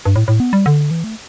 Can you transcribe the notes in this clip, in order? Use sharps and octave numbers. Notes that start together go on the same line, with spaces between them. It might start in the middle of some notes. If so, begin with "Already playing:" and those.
G2
A2
A2
B3
G3
D3
E3
A3